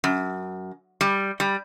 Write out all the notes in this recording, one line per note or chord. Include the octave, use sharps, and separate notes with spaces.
F#2
G3
G3